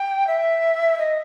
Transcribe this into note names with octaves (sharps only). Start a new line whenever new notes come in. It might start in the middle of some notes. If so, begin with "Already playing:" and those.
Already playing: G5
E5
D#5